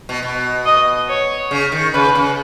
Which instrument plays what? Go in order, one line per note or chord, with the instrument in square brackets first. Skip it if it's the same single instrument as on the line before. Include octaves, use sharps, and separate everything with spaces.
[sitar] B2
B2
[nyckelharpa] D#5
C#5
[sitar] C#3
D#3
[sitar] C#3 [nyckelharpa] B4
[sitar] C#3